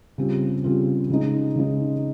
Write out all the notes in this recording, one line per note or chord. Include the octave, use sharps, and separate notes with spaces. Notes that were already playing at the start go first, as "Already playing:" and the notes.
C#3 G3 C4 F4
C#3 G3 C4 F4
C#3 G#3 D#4
C#3 G#3 D#4